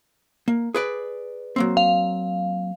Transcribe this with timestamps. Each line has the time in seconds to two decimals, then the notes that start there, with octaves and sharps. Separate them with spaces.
0.48 A#3
0.74 G#4 B4 D5
1.56 F#3 A#3 C4
1.77 F5